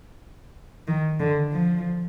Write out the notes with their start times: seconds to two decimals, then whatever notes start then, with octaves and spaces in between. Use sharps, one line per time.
0.88 D#3
1.20 D3
1.52 F3